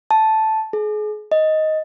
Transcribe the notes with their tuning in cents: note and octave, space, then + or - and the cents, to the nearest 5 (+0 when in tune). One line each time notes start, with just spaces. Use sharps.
A5 -5
G#4 +35
D#5 +10